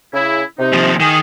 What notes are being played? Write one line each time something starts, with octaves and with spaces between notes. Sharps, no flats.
C#3 E4
C3 D#4
D#2 F3
D#3 G#4